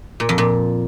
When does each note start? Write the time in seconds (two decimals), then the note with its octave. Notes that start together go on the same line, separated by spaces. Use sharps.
0.20 A#2
0.29 F2
0.38 A#2